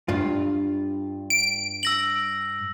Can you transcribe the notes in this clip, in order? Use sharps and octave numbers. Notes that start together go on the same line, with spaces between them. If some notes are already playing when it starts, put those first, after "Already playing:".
G2 F4
D7
E6 A#6 F#7